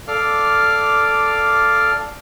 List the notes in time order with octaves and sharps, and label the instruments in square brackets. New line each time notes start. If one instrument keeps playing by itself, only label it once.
[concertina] A4 D5 F5 D6 F6